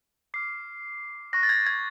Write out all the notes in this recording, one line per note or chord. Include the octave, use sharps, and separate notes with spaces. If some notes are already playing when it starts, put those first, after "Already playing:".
D6 F6 C7
C#6 F#6 A#6
A6
G#6
G#6